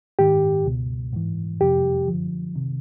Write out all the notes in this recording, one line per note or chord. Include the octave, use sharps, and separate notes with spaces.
G#2 D#3 G4
C#2 B2
G#2 E3
F2 C3 F3 G4
F#2 D3 F3
C3 D#3